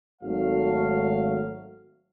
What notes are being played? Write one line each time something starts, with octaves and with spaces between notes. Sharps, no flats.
G#1 F#3 A3 F5